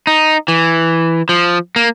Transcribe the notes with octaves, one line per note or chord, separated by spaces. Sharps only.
D#4
E3
F3
A#3